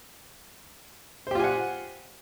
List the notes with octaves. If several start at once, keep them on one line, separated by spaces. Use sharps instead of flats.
F4 G4 C5 F#5 G#5